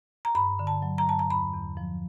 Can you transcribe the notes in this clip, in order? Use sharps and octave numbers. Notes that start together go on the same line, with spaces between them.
A#5
G2 B5
D3
A5
F#3
A#5
G2 A5
A#5
E2 B5
E2
F3